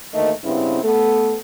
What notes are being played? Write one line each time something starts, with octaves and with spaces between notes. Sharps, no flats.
D2 D#3 A3 A#3 D#5
G2 C#3 B3 C4 E4
A3 B3 A4